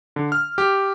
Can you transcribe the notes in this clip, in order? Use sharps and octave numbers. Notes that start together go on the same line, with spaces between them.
D3
F6
G4